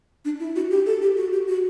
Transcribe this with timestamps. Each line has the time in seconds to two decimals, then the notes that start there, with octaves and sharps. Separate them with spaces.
0.25 D4
0.40 E4
0.56 F#4
0.71 G4
0.86 A4
1.02 G4
1.17 F#4
1.33 G4
1.48 F#4